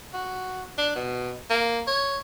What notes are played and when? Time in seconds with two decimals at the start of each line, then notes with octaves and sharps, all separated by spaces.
0.14 F#4
0.78 D4
0.95 B2
1.50 A#3
1.87 C#5